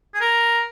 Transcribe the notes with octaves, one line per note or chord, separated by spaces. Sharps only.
G#4
A#4